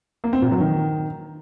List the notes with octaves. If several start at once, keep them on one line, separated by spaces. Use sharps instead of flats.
A#3
C4
A#2
F#3
D#3